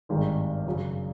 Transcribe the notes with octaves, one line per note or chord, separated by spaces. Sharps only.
G#1 G2 D#3 G#3
F#2 C#3 F#3